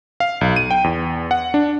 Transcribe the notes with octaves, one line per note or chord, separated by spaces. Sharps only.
F5
B1
D#7
G5
E2
F#5
D4